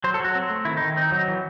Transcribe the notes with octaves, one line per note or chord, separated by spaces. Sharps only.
F#3 C5
A4
F#3 F#4
C4
A3
D#3 E4
D#3 D#4
C4 D#4
F#3
E3